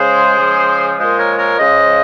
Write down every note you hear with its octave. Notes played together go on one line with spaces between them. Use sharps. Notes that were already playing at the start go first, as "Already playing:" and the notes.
Already playing: C#3 G#3 G#4 C5
C#3 F3 G#3
A#2 F3 G#3 C5 D#5
A#4 C#5
A#4 C#5
C#3 F3 G#3 C5 D#5